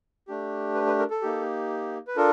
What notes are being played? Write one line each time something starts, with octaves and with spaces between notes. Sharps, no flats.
A3 D4 G4
B4
B4
A#4
A4
A#3 D#4 G4
B4
D4 F4 A4 A#4